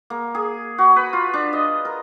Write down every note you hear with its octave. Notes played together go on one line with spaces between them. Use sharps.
A#3
G#4
F#4
B4
F4
D4
D#5
A#4